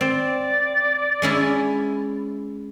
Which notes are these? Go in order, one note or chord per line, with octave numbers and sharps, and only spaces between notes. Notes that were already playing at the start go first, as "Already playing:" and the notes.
C4 D5
G#3 C#4 E4